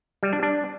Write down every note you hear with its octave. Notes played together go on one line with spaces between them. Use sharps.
G3
D4
D4